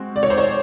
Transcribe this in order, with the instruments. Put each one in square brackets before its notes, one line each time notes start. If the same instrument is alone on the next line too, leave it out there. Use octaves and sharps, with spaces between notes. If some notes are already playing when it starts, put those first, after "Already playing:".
Already playing: [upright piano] G#3 C4 F#4
[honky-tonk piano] D5
C#5
C5
C#5